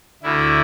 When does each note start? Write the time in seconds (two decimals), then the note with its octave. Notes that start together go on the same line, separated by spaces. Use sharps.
0.23 D2 D3 E4